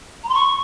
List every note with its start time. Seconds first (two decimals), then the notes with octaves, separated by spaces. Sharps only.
0.23 A#5
0.28 C6
0.34 C#6